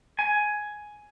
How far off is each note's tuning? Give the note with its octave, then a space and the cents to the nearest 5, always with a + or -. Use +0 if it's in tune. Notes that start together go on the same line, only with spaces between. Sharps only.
G#5 +10